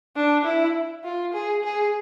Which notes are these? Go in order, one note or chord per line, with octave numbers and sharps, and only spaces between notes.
D4
E4
F4
G#4
G#4